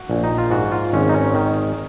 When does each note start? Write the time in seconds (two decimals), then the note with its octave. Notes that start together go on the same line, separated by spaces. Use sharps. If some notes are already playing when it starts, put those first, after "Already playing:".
Already playing: F#4
0.10 A#1
0.24 D#4
0.38 F4
0.51 G#2 F#4
0.72 F4
0.93 G#1 C#4
1.09 D#4
1.14 C#4
1.34 D#3